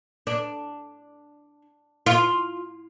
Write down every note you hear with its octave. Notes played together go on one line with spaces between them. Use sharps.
D4
F4